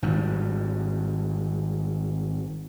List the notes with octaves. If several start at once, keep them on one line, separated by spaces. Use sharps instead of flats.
G#1 G2